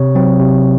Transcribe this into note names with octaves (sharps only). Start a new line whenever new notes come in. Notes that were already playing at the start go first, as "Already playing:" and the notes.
Already playing: C3 C#5
F#3 C4
C3